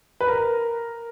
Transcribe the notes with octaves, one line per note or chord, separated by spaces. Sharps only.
B4
A#4